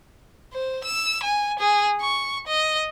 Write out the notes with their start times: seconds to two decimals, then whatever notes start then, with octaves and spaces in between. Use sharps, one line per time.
0.53 C5
0.84 E6
1.23 G#5
1.59 G#4
2.01 C#6
2.47 D#5